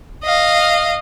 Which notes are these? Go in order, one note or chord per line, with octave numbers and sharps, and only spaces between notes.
D#5 F5